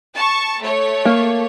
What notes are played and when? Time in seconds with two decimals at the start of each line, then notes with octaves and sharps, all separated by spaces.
0.15 A5 C#6
0.60 A3 C#5
1.05 A#3